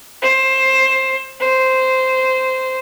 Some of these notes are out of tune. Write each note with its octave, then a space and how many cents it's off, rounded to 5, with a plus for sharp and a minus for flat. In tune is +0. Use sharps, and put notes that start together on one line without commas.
C5 +15
C5 -10